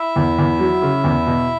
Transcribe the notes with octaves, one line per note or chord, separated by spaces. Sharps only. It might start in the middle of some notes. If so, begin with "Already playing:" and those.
Already playing: E4 E5
E2
E2
F#3
C#3
E2
B2